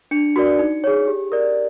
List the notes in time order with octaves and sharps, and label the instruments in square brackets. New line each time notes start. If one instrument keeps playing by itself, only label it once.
[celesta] D4 C#7
F#4 A#4 D5
D#4
G#4 C#5
G4
A#4 D5